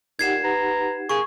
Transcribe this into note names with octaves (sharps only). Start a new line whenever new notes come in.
A#2 D#4 G4 F#5 G#6 C7 E7
B4 A#5
A#3 G#4 C#6